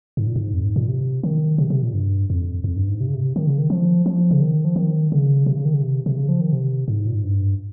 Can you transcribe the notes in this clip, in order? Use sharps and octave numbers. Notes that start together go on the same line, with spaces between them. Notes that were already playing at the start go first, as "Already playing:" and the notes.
G#2
A#2
G#2
F2
G#2
A#2
C3
D#3
C3
C3
A#2
G2
F2
F2
G2
G#2
C3
C#3
C3
D#3
C#3
D#3
F3
F3
C#3
D#3
F3
D#3
C#3
C3
C#3
D#3
C#3
C3
C3
C#3
F3
D#3
C3
G#2
A#2
G#2
G2